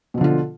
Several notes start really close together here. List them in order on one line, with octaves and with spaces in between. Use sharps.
B2 F3 D3 F4